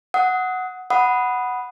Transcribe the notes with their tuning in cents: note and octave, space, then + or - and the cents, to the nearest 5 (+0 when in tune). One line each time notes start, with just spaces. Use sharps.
F#5 +0 D#6 +25
F#5 +0 B5 +0 D#6 +0